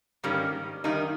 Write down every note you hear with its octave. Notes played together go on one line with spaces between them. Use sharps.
G#2 D#3 G3 A#3 C#4
F#2 D#3 G3 A#3 D#4